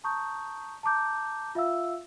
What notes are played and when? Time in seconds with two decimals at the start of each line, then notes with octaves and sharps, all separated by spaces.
0.04 A5 A#5 C#6 D#6 G6
0.83 A5 A#5 D6 G6
1.55 F4 E5 F5 E6